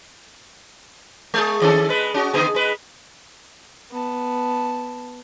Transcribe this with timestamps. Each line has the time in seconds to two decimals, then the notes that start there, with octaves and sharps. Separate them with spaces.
1.34 G#3 G#4
1.62 D#3 C#4 A4
1.89 G#3 B4
2.14 C#4 F#4
2.33 D3 B3 G#4
2.55 G#3 B4
3.92 B3 A5